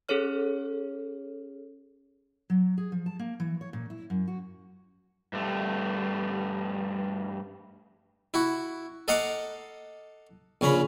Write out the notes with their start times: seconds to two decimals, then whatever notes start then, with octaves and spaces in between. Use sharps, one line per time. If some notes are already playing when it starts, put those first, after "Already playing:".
0.09 C#4 G#4 A4 C#5 F6
2.50 F#3
2.78 G#4
2.92 F3
3.06 A5
3.19 A#3
3.40 E3
3.61 C#5
3.73 A#2
3.90 E4
4.10 F#2
4.28 F#4
5.33 G2 A3
8.34 E4 F#4
9.08 A4 D#5 F5 F#5 A#5 D6
10.61 A#1 C#3 C#4 A#5 B5